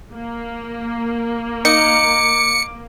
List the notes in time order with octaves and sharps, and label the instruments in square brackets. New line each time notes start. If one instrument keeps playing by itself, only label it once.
[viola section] A#3
[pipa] D#4 [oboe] D6 [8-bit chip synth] C#7